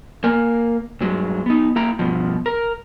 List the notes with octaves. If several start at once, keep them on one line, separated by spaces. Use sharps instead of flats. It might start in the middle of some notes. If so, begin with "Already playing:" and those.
A#3 A#4 G#5
G2 F#3 G#3
B3 D#4
A#3 E4 G5 A#5
G2 B2 F3
A#4